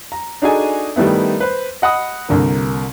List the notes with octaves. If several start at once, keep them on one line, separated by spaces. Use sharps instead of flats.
A#5
D4 D#4 F#4 G#4 A4 G#5
D#3 G3 A3 B3 E4
B4 C5
D#5 F#5 B5 D#6
C2 D3 A#3